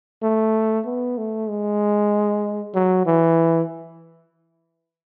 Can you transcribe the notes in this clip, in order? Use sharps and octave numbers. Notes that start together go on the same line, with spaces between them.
A3
B3
A3
G#3
F#3
E3